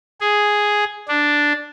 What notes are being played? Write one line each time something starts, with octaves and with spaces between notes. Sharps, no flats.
G#4
D4